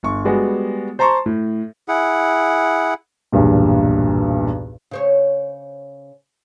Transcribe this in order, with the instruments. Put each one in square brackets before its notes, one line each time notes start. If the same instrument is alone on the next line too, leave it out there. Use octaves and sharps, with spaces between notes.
[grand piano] G1 C#6
G3 G#3 B3 F#4
C5 A5 A#5 C6 C#6
A2
[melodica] E4 G#4 F#5
[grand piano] B1 E2 G2 A#2
[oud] C#3 C5 C#5